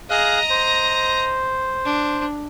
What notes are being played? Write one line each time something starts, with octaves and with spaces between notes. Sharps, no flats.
G#4 D#5 F5 A#5 F#6
C5
D4